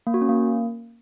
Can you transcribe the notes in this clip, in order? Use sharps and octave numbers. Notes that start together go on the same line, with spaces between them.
A#3
F#4
C#4
A#3